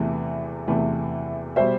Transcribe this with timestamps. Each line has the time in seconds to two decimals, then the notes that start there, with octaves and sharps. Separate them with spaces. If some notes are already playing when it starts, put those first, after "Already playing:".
Already playing: E2 C3 E3 A3
0.68 E2 C3 E3 A3
1.56 B2 G3 C5 E5